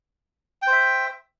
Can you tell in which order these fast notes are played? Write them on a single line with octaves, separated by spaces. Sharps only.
G5 C5 E5